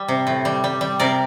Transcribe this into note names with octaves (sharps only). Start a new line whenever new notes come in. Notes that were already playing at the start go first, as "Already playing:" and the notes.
Already playing: G3
C3
A2
G3
G3
G3
C3 A#4 D5